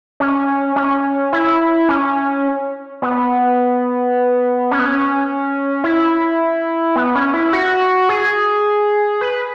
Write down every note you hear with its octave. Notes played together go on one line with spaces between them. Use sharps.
C#4
C#4
E4
C#4
B3
C#4
B3
C#4
E4
B3
C#4
E4
F#4
G#4
B4